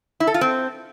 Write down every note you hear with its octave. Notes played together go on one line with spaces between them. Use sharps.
E4
A4
F4
C4